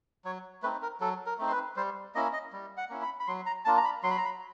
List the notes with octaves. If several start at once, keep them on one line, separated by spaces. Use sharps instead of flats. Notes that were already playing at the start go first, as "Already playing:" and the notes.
F#3 C#5
A3 C4 D#4 B4
A#4
F#3 A4
A#4
A3 C4 D#4
C5
B4
G3 C5
A#3 C#4 E4 D#5
D#5
G3
F#5
A#3 C#4 E4
B5
B5
F#3 C6
A#5
A#3 D4 F4 A5
A#5
B5
F#3 C6
B5
A#5
B5